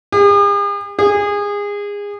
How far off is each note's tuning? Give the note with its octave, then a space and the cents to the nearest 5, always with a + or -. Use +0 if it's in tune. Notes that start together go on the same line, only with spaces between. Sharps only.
G#4 -45
G#4 -25